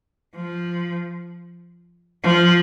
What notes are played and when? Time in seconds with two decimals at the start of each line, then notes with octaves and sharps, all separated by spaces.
0.36 F3
2.24 F3